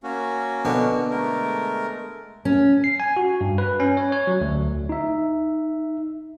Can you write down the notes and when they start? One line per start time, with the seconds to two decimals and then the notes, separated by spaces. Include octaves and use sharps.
0.04 A#3 C#4 F#4
0.65 B2 D3
1.10 G#3 A3 A#4
2.45 C#4
2.84 C7
3.00 G#5
3.17 F#4
3.41 G2
3.58 B4
3.80 C#4
3.97 C#5
4.12 C#5
4.27 F#3
4.41 D2
4.89 D#4 E5